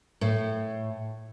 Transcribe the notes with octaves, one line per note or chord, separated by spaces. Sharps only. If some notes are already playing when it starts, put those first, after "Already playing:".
A2